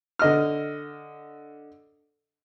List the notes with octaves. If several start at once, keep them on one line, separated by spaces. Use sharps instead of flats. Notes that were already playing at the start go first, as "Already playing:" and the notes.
D3 D#5 F6